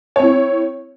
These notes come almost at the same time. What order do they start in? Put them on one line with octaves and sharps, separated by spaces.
C#5 C4 E4